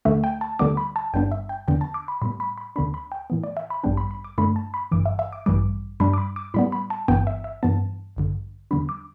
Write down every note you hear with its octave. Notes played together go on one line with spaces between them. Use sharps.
D2 D3 A3 E5
G5
A5
D2 D3 G3 B3 D6
B5
A5
G1 G2 G3 B3 D4 G5
E5
G5
E2 D3 B3 D4 G5
A5
D6
B5
A2 G3 B3 B5
B5
B5
D2 D3 B3 D4 B5
B5
G5
A2 E3 B3
D5
E5
B5
A1 G2 G3 B3 D4 G5
B5
B5
D6
G2 D3 A3 D4 B5
A5
B5
G1 G2 E3 D6
E5
E5
D6
A1 G2 E3 G3 D6
G2 G3 D4 B5
D6
B5
D6
A2 G3 B3 B5
B5
A5
G1 G2 E3 B3 G5
E5
E5
G2 E3 B3 A5
A1 G2 D3
E2 D3 G3 B3 D4 B5
D6